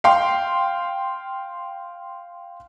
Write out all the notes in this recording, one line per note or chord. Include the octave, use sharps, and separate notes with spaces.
F5 G5 C6